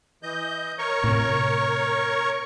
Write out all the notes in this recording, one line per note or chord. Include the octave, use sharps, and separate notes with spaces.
E3 D#5 G6
A#4 C#5 C#6
A2 C3